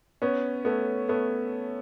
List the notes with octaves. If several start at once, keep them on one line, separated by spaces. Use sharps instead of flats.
B3 C#4
A3 B3
A3 B3